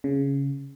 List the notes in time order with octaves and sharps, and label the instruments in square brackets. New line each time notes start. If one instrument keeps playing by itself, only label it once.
[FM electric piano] C#3